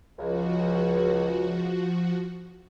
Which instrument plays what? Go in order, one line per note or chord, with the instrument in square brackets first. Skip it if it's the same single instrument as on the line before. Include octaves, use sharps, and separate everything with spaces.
[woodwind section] C#2 [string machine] F3 F#4